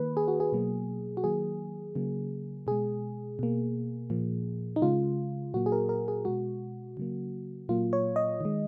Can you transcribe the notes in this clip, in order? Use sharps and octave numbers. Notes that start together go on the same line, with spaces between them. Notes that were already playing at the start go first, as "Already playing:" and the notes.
Already playing: D#3 A#3 B4
G#4
F#4
G#4
B2 F#3 A#3
F#4
D#3 F#3 A#3 G#4
C#3 F#3 A#3
B2 G#3 G#4
B2 A#3
A#2 F3 A#3
D#4
C#3 G#3 F4
A#2 F#3 A#3 F#4
G#4
A#4
A#4
G#4
B2 G#3 F#4
C#3 F#3 A#3
A#2 F#3 A#3 F4
C#5
D#5
D#3 G#3